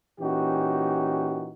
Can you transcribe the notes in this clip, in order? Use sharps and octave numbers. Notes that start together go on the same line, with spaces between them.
A#2 E3 C#4 D#4 F#4 G4